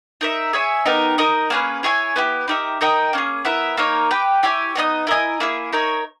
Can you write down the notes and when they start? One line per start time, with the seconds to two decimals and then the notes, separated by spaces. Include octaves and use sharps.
0.21 D#4 A#4 E5
0.53 G#4 C#5 E5 G#5
0.86 B3 D#4 G4 A#4
1.18 D#4 A#4 D#5
1.50 A#3 C#4 G#4 B4
1.83 E4 G#4 C#5 G#5
2.16 B3 E4 G4
2.48 D#4 G4 A#4 E5
2.81 D#4 A#4 D#5 G5
3.13 A#3 C#4 G#4
3.45 B3 E4 A#4 E5
3.77 A#3 D#4 A#4 C#5
4.11 G4 B4 G5
4.43 E4 G4 C#5 G#5
4.75 B3 D#4 A#4 D#5
5.07 E4 A#4 D#5 G#5
5.40 A#3 E4 G#4
5.73 D#4 A#4 C#5